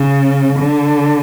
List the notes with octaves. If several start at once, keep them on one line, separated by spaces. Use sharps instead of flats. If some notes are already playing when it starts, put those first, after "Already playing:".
Already playing: C#3
D3